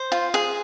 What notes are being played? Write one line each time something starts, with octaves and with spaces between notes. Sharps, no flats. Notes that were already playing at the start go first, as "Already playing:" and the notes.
Already playing: C5
F4
G#4